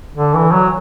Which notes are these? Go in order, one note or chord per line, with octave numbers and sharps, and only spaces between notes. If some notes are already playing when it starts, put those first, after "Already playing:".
D3
E3
F#3